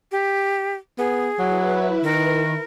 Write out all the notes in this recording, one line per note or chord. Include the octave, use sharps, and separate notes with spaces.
G4
B3 G#4
F#3 E4 B4
D#3 A#4